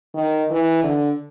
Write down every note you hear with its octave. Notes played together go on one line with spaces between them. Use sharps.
D#3
E3
D3